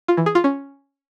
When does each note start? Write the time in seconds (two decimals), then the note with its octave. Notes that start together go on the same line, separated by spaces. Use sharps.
0.08 F4
0.17 E3
0.26 G#4
0.35 F4
0.44 C#4